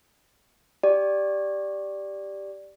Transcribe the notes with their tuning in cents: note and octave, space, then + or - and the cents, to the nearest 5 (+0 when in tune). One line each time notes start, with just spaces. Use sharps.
G4 +0 D5 +0